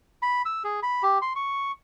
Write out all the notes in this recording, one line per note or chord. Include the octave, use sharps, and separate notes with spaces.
B5
E6
G#4
B5
G4
C6
C#6